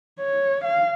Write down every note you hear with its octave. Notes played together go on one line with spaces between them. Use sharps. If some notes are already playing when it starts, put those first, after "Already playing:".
C#5
F5